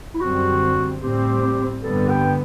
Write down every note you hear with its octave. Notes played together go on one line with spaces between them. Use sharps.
E4
F#2 D3 G3 C4 F#4
A2 G3 C4 G4
G2 D3 G3 B3 A4
G5